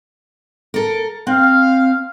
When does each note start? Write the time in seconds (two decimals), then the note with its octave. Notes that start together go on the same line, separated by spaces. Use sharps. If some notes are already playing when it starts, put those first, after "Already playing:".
0.74 A4 A#4
1.27 C4 F5